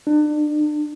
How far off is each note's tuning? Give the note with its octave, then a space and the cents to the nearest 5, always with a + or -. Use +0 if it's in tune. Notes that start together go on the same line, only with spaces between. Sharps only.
D4 +35